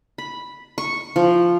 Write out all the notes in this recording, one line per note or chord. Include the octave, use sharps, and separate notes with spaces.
B5
C#6
F3